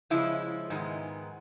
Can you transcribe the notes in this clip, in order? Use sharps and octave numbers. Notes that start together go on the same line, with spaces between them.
C#3 F3 G#3 E4
G#2 D#3 G#3 B3